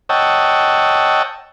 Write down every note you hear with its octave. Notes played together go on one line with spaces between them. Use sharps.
C#5 D#5 F#5 G5 A5 E6